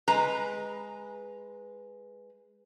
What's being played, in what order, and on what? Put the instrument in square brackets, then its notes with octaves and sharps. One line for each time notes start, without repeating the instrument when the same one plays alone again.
[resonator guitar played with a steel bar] G#3 B4 A#5